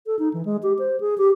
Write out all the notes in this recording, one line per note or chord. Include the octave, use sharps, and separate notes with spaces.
A4
D#4
E3
G#3
G4
C5
G#4
G4